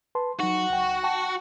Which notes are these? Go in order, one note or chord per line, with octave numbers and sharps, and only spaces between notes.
B4 A5 C6
F#3 D#4 F#4
C#2 G5
G5 A5 C#6